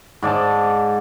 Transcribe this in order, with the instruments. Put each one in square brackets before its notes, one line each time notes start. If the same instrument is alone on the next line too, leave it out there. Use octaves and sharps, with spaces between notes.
[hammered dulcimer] G#2 D5 A5